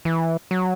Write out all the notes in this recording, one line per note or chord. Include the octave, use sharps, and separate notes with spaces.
E3
F#3